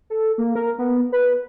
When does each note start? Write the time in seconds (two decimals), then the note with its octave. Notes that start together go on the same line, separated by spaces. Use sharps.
0.10 A4
0.38 A#3
0.55 A#4
0.79 B3
1.12 B4